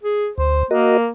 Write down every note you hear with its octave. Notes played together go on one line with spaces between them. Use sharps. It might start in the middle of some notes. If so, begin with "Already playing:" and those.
G#4
D2 C5
A#3 F#4 A#4 D#5